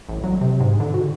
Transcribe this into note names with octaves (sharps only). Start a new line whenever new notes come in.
A1
F#3
C3
G#2
D3
F#4